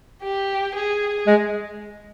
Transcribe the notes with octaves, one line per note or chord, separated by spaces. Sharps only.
G4
G#4
G#3